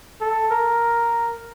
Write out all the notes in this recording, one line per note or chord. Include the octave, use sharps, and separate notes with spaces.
A4
A#4